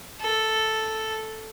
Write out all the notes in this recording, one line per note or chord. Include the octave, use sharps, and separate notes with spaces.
A4